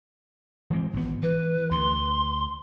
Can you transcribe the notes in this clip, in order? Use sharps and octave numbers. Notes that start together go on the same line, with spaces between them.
E3 G#3 C4
G#1 B3
E3 B4
D2 C6